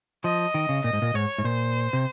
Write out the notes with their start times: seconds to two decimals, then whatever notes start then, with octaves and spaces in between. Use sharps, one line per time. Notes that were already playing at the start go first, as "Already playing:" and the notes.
0.24 F3 D#5
0.54 D#3
0.69 C#3
0.84 A#2 D#5
0.93 G#2
1.02 A#2
1.14 G#2 C#5
1.38 G#2
1.44 A#2 C5
1.93 C3